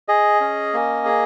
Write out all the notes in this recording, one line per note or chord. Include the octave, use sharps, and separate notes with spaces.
G#4 D#5
C#4
A#3
G#4